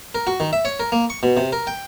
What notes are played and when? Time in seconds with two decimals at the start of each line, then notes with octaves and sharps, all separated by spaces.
0.15 A#4
0.27 F#4
0.40 D#3
0.53 E5
0.65 C#5
0.80 A#4
0.92 A#3
1.10 C#6
1.23 B2
1.37 C3
1.53 A#4
1.67 G5